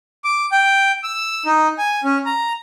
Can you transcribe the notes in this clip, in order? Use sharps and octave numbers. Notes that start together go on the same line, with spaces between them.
D6
G5
E6
D#4
G#5
C#4
A#5